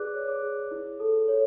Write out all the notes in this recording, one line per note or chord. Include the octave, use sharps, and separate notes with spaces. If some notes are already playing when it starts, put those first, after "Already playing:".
Already playing: G#4 B4 D5 D6 F#6
C#5
D6 F#6
G#4
E4
A4
C#5